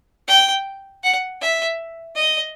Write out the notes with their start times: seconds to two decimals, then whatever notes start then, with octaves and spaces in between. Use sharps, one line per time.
0.28 G5
1.04 F#5
1.41 E5
2.16 D#5